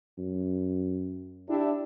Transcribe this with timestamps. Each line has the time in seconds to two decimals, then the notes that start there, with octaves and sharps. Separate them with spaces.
0.18 F#2
1.49 D4 E4 G4